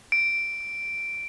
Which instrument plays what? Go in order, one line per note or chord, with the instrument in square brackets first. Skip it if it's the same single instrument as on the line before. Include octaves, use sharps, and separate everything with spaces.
[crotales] D7